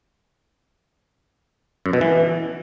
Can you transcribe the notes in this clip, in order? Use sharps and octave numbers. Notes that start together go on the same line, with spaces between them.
F#2
B2
E3